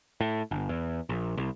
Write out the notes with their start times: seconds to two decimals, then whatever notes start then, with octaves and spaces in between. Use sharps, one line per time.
0.21 A2
0.51 G1
0.69 E2
1.09 A#1
1.37 C2